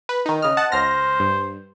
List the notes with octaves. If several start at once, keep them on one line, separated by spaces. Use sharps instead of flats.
B4
D#3 D#4
C#3 D#5 F6
F#5 A5
C#2 C5 F6 A#6
G2